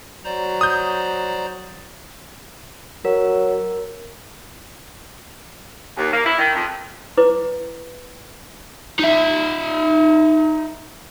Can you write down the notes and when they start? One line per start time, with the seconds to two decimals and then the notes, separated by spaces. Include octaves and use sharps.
0.24 F#3 C5 D5 A#5
0.61 D#6 G6
3.05 F#3 A#4
5.97 D#2
6.12 A#3
6.24 E4
6.38 D#3
6.54 F2
7.17 E4 B4 D6
8.99 D#4 E5